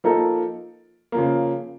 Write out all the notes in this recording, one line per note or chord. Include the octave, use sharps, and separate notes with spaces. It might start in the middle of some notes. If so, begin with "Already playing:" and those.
F3 A#3 D#4 A4
C#3 F3 A#3